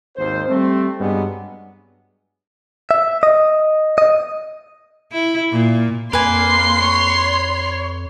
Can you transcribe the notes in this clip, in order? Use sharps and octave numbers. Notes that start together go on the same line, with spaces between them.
G#1 D#2 C5
G3 A3 C4
G2 F#3 G#3 B3 D4
E5
D#5
D#5
E4
A#2
F2 A#3 B4 G#5 C6
C#5